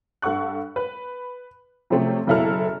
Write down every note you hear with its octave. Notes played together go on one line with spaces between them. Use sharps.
G2 A4 F#5 C#6 F#6
B4
C3 F3 F#3 A3 C4 C#4
F#1 B2 E4 A4 F6